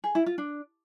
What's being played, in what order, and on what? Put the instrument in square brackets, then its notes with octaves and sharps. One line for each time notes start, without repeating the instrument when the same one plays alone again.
[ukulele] G#4
E4
F4
D4